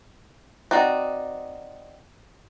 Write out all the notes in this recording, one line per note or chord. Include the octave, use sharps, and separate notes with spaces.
C4 D#4 F#4 D5